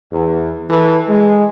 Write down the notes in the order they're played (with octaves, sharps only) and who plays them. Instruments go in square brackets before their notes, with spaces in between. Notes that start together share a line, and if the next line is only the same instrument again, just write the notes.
[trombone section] E2
E3 A4 B4
G#3